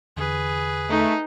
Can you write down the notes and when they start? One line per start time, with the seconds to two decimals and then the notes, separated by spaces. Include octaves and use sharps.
0.17 E2 D3 G#4 B4
0.90 A3 D#4